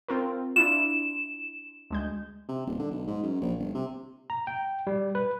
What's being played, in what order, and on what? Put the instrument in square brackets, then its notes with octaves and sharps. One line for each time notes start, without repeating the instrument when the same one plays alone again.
[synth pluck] C4 F4 A#4
[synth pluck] D4 E4 F4 [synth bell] E7
[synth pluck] D2 G#3 G6
[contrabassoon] C3
D#1
D3
B1
G#2
F#2
A#1
G1
C3
[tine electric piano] A#5
G5
G3
B4